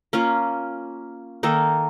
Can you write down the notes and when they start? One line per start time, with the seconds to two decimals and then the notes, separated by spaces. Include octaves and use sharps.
0.13 A#3 C#4 F4
1.43 D#3 A#3 D#4 A4